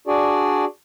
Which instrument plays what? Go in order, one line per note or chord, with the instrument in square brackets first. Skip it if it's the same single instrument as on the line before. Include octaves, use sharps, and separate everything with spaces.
[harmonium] D4 F#4 G#4 D5